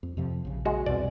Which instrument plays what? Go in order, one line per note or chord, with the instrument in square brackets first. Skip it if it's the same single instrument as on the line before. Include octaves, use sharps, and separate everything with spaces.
[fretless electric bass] F2
F2 C3 F3
A#1 C#3
[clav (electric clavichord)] G#3 F#4
[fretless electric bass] C2 F2 B2 [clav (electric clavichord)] D5